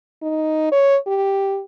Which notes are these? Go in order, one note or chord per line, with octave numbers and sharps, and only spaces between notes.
D#4
C#5
G4